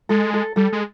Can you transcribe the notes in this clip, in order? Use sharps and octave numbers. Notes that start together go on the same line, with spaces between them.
G#3 A4
A4
G3 A4
G#3